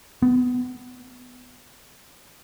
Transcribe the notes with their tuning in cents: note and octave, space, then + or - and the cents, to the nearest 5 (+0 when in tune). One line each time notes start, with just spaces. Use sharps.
B3 +15